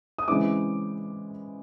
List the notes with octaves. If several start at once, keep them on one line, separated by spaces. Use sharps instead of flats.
D#6
C#3 E3 G#3 C4 E4 D6